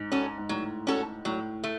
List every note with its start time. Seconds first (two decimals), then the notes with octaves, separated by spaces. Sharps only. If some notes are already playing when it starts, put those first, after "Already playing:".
Already playing: G#2
0.12 C#4 F#4 A4
0.38 G#2
0.49 A2 F#3
0.87 C#4 F#4 A4
1.25 A2 F#3
1.64 A3